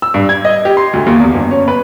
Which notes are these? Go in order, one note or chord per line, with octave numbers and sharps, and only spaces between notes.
E6
G2
G#6
D#5
G4
C6
D2
D#2
E2
G1
C#4
B4